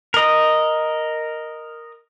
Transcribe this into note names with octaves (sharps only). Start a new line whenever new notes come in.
A#4 D#5